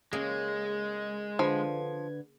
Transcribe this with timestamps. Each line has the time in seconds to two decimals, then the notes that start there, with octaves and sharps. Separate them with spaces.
0.13 C#3 G#3 A#3 G#4
1.39 D3 F3 B4 G#6